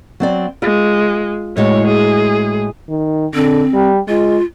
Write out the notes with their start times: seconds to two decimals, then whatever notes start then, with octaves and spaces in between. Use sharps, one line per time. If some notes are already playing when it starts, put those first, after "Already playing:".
0.20 F#3 C4 D5
0.62 G#3 F4
1.57 A2 G#3 F#4 C#5
1.88 G#4
2.89 D#3
3.34 D3 C4
3.73 G3
4.08 G#3 F4